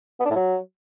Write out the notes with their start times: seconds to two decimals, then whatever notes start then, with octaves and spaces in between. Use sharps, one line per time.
0.20 B3
0.25 D4
0.30 A2
0.36 F#3